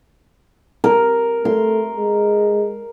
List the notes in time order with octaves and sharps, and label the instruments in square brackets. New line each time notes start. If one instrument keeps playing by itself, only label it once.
[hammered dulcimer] A#4
[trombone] A3 [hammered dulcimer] C6
[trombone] G#3